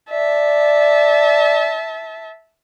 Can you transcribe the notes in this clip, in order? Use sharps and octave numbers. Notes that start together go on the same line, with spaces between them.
D5 E5 A5